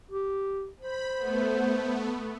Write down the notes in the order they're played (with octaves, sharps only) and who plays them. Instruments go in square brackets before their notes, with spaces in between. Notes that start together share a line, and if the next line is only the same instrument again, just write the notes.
[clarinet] G4
[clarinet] C5 [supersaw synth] B5
[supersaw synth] A3 B3